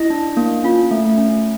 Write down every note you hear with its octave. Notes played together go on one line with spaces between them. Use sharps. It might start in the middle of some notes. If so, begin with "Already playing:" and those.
Already playing: E4 D#5
D4
A#3
C#4 F4
A3
C#4